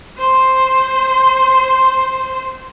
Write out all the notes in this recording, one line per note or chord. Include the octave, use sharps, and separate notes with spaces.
C5 C6